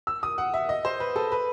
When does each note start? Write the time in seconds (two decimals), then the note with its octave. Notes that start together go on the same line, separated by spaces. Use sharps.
0.07 E6
0.23 D#6
0.38 F#5
0.54 E5
0.69 D#5
0.85 C5
1.00 B4
1.16 A4
1.32 B4